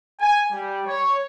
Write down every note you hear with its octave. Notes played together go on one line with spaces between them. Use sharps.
G#5
G3
C#5